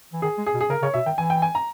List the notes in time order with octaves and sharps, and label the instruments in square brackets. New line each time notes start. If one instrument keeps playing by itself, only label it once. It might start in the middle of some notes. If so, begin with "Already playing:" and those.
[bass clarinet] E3
[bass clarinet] D#3 [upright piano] G#4
[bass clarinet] G#3
[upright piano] G#4
[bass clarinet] B2
[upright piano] G#4
[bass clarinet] C#3 [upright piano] A#4
[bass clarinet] C#3 [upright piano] C#5
[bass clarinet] B2 [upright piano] E5
[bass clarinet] D#3 [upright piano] G5
[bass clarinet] E3 [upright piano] G#5
[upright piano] G5
G#5
A#5